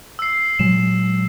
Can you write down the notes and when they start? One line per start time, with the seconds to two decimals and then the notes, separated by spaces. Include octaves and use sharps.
0.19 E6 C7
0.59 A#2 F#3 G#3 E7